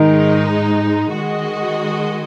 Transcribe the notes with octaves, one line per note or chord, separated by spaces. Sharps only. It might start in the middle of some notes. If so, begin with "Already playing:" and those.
Already playing: G#2 D#3 G#3 D#4
D#3 G#3 F#4 D#5